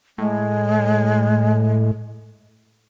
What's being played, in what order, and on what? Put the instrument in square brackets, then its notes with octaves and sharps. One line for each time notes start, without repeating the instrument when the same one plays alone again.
[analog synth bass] A2 [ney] G#3